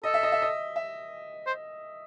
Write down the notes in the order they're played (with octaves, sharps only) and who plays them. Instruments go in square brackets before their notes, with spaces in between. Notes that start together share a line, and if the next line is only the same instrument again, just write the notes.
[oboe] A4 [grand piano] D#5
[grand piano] E5
D#5
E5
D#5
E5
[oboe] C5